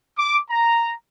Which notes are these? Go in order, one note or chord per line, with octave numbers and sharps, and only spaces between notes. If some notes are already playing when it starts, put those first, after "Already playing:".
D6
A#5